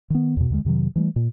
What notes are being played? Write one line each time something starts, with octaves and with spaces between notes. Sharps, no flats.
D#3 B3
E2 B2
D#2 D3 G#3
F2 C3 D#3 F#3
E3 G3 A3
A#2